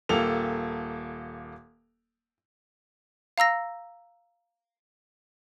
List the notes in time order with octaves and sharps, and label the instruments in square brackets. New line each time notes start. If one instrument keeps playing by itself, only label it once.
[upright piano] D#1 A#3 A4 F7
[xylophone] F5 A#5 E6 A#6